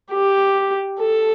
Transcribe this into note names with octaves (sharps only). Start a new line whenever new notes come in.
G4
A4